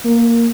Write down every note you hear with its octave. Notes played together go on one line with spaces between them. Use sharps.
A#3